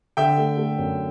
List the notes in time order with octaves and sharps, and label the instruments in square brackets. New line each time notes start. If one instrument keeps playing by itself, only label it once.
[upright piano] D3 [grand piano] E5 G5
[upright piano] A3
A3
F#2